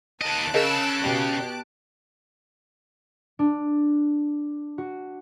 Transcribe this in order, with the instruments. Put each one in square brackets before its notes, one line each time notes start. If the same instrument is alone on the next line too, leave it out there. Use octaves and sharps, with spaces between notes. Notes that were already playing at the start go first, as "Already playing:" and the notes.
[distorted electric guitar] D#2 D#5 [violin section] A5 F#6 D7
[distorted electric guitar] C#3 [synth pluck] G#4 A#4 D#5 [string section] E6
[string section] B2 G4
[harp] D4
F#4